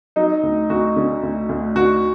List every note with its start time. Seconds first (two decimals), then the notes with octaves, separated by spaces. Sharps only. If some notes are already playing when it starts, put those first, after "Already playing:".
0.16 F#3 D#4
0.43 D2
0.70 D2 F#4
0.96 D3
1.23 D2
1.49 D2
1.75 D2 F#4